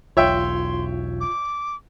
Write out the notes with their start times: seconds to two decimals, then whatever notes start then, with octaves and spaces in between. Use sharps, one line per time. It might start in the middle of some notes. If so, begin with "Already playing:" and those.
0.17 E1 B1 F4 C#5 E5 G5 C6
1.20 D6